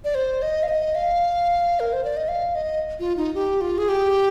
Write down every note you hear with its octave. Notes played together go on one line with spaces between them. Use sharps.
D5
C5
D#5
F5
D#5
F5
A#4
C5
D5
D#5
F5
D#5
F4
D#4
G4
F4
G#4
G4